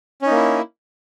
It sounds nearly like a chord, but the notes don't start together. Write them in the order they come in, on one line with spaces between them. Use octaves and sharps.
C#4 D#4 A#3 E4